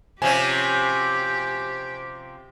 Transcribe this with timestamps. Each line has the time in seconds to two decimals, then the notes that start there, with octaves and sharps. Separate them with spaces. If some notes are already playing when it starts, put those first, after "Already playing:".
0.22 C3 F3 C#4 G4 G#5